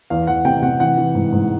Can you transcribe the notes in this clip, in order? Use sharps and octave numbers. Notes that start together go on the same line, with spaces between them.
E2 F5
E2 F#5
C3 G5
C3 F#5
E3 F#5
E3
G#2
G#2